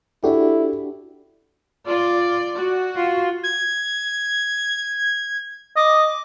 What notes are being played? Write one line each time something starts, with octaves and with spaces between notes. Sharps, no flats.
D4 E4 F#4 G4 A4
F4 D5
F#4
F4
G#6
D#5 D6